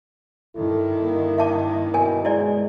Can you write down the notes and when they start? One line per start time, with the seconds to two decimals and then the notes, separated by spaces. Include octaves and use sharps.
0.56 G2 D#3 E4 A4
1.01 A#3
1.38 E5 A5 D6
1.94 B2 A#4 G#5
2.25 G#3 E4 D5